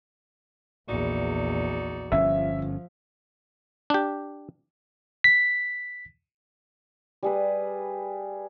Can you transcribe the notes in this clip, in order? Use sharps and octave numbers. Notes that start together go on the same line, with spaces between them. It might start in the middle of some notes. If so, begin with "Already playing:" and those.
A#1 E2 D#4 F#4 D5
G1 F3 C#4 E5
D4 G4
B6
G3 G#4 B4